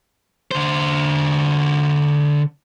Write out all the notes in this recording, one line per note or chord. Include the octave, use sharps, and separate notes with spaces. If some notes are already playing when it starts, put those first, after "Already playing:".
D3 C5